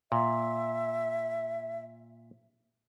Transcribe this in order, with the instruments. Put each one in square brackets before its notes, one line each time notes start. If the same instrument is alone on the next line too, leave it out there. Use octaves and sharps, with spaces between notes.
[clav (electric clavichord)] A#2 [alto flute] E5